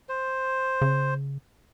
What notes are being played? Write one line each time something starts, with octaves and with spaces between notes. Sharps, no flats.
C5
C#3